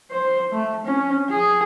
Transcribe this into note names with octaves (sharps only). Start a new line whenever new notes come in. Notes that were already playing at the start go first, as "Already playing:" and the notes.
C5
A3
C#4
G#4